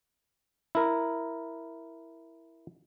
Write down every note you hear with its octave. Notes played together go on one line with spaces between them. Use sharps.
E4 A#4